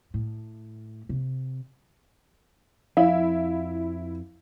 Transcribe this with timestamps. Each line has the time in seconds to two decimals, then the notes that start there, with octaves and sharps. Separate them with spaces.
0.14 A2
1.09 C3
2.97 F2 F3 E4 F5